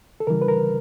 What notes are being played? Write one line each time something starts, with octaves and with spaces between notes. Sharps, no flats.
A4
C#3 E3 G3 A#4
B4
A#4